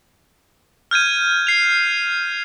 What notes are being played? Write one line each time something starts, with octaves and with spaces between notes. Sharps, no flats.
F6 G6 G#6 D#7
C7 F7